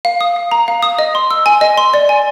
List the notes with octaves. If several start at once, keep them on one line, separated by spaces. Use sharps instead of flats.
F5
D#6
F5
A#5
F5
D#6
D#5
C6
E6
G#5
D#5
C6
D5
G#5